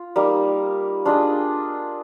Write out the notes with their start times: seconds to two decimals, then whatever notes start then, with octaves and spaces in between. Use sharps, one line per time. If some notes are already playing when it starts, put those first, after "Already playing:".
Already playing: F4
0.16 G3 A#3 D#4
1.05 D4 F4 G#4 D#5